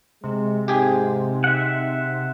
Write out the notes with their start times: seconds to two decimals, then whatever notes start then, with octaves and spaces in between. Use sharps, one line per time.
0.24 C3 G#3
0.68 G#2 G4 G#4
1.44 D#4 E5 F#5